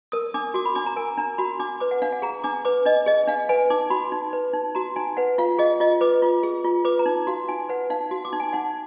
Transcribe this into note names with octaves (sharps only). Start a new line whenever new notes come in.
A#4 D#6
D4 D6
F#4 D6
B5
D4 D6
A#5
A#4 G#5
D4 A#5
F#4 B5
D4 D6
B4 D6
F#5
D4 F5
F#5
G#4 A#5
D4 D6
B4 D6
D4 D#5
G#4 D#5
D4 F5
B4 G#5
D#4 D6
F#4 B5
D#4
B4
D#4
F#4 A#5
D#4 G#5
B4 F#5
F4 F5
G#4 D#5
F4 D#5
B4 D6
F4
G#4
F4
B4 D6
A#5
D#4
F#4 F5
D#4 G#5
B4 F#5
D#4 F5
F#4
D6
D#4
G#5
D#4 F#5